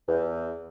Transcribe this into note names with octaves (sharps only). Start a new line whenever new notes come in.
E2